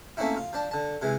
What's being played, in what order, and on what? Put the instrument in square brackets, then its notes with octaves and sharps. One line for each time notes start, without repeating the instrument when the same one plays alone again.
[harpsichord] A3 A#3 C4 C#4 D#4 E4
F4
F3 D4 A5
D3 A5
C3 E3 G#3